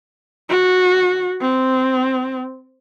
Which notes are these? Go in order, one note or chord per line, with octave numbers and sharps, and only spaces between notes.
F#4
C4